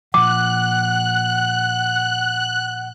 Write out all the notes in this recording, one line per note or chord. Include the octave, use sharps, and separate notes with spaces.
A#2 F3 F#5 D6 F#6